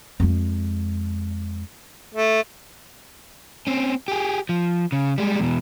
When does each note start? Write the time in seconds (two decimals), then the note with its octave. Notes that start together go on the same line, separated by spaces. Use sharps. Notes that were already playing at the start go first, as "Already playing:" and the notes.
0.20 F2 G#3
2.14 A3
3.67 C4 C#4
4.08 G4 G#4
4.49 F3
4.92 C#3
5.18 G3 G#3
5.40 E2 B2